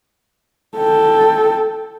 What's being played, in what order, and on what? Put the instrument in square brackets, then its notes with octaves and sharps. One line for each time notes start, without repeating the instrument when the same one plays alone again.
[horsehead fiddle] A4 G5